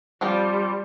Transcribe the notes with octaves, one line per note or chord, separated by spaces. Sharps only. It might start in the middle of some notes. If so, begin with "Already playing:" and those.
F3 G3 C4 F4